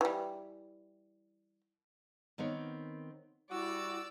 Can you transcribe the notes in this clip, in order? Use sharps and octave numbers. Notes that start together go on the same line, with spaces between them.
E3 G3
D#3 B3 C4 A#4 C#5
G3 E4 F#4 D5 E6